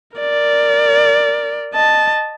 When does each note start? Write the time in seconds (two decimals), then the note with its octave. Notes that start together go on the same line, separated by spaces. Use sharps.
0.17 A#4 D5
1.74 D#5 A5